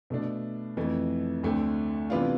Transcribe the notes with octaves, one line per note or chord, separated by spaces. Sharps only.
B2 A3 D4
F2 E3 A3
D2 D3 A3 C4
C3 E3 B3 D4 F4